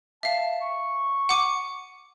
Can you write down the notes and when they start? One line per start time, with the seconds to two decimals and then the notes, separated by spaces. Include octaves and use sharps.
0.23 E5 F5 A5
0.61 C#6
1.29 F#5 D6 D#7